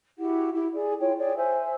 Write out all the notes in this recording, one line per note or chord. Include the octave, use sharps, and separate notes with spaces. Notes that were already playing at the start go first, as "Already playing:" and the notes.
E4 F#4 G4 F#5
E4 G4
G#4 D5
E4 F4 C#5 G5
G#4 C#5 D5 G5
C5 E5 G#5 E6